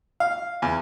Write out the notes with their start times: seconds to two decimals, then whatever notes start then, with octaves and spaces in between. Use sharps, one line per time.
0.20 F5
0.62 E2